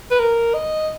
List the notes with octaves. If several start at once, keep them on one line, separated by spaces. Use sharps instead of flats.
B4
A#4
D#5